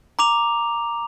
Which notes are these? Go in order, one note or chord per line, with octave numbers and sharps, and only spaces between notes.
A#5 D6 F7